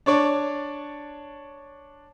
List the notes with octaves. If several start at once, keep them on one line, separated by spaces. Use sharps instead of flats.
D4 C#5 D5 A5